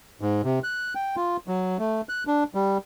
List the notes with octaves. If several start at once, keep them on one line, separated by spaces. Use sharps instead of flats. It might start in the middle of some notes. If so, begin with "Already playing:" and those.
G#2
C3
F#6
G5
F4
F#3
A3
F#6
D4
G3